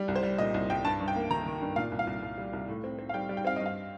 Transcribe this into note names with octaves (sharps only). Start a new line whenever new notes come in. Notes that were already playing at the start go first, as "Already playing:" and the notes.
Already playing: G3
C2
C5
G3
A#2 D#5
C2
C2 G5
G2 A5
G2
G5
A#3
D#3 A#5
D#3
G2
A#2 F5
C2
F5
C2
C2
G3
C2
A2
C4
C4
F5
G3 G5
G3
G5
C4 F5
G2 D#5
F5